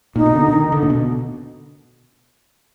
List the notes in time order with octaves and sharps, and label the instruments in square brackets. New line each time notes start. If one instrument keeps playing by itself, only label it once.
[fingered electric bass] A#2 [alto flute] D#4
[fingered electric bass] B2
D3
D#3
D3
A#2
B2